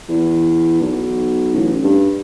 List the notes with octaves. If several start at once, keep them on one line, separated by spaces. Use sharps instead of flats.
E2
B1
A1
G2